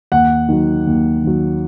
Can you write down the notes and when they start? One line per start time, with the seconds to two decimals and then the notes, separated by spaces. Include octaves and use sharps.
0.12 D#2 F#5
0.49 D#3 F#3
0.87 D#2
1.24 D#3 F#3